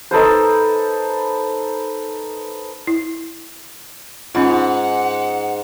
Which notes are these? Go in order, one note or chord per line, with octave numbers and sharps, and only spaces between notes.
D#4 A4 B4 C5
E4
G#2 C#4 D#4 F4 F#5